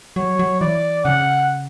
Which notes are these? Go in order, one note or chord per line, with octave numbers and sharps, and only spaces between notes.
F#3 C#5
F#3
E3 D5
C#3 F#5